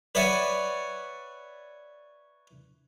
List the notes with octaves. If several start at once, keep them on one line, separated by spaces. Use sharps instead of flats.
B4 C#5 D5 E5 F#5 G#5